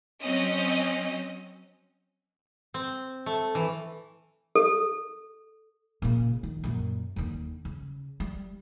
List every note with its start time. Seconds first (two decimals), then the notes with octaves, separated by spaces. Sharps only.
0.22 F#3 C4 C#4 D#5
2.74 C4
3.26 A3
3.55 E3
4.56 A4
6.02 A#2 C#3
6.43 D#3
6.64 F#2 A#2
7.16 D#2 D3
7.65 C#3
8.20 G3